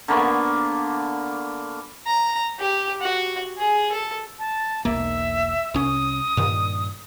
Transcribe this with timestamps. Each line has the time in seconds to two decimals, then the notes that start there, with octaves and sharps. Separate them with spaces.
0.08 D3 A#3 B3 C#6
2.07 A#5
2.59 G4
3.01 F#4
3.58 G#4
3.92 A4
4.39 A5
4.85 E1 B1 A#3 E5
5.74 C2 C#4 D#6
6.37 G2 A#2 D#3